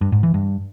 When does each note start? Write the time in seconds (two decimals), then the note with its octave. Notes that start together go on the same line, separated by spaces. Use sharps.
0.01 G2
0.12 G#2
0.23 E3
0.34 G2